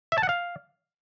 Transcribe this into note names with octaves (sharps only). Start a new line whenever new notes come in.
E5
A5
F#5
F5